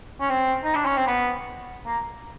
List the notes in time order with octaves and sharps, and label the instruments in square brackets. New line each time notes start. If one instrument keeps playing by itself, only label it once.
[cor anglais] C#4
C4
D#4
D4
C#4
C4
B3
A#3